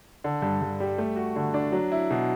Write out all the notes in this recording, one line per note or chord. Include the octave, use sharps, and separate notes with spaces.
D3
G2
G2
G3
A3
F#4
D3
D4
F#3
E4
B2